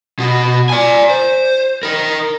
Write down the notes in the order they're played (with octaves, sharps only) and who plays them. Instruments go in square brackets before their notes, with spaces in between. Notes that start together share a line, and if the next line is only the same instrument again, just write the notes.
[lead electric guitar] B2 F#4
D5 G#5
C5
D#4 A#4